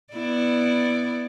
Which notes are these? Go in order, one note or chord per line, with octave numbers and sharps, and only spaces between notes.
B3 E4 D5